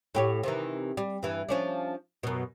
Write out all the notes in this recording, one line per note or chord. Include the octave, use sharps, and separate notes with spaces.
A2 G4 C#5
C3 D#3 E3
G3
G2 E3
F3 C#4 D4
F#2 B2